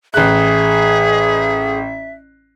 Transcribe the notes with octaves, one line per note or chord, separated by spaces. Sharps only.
A1 G#4 E5 F#6